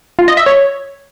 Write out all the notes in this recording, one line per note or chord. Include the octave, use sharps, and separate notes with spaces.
F4
D#5
E5
C#5